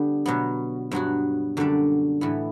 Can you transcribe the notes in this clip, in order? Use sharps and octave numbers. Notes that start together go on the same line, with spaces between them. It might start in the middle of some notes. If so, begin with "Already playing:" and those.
Already playing: D3 G3 B3 D4 G4
B2 F#3 B3
G2 F#3 B3 F#4
F#2 D3 G3 D4
A2 E3 B3